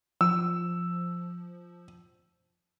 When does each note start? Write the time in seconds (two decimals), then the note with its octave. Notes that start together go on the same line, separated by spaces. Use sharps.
0.21 F3 E6